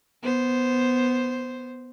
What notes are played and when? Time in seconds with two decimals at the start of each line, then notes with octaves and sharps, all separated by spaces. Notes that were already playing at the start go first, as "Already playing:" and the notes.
0.22 B3 C5